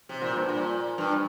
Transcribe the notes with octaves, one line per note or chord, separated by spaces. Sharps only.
C3
A#2
G2
A#2
G2